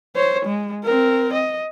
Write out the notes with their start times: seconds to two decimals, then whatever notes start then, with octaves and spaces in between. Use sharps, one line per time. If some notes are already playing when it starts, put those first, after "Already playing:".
0.16 C5 C#5
0.45 G#3
0.85 C4 A#4
1.33 D#5